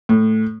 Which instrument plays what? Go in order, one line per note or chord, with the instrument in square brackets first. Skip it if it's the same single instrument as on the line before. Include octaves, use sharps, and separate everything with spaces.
[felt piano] A2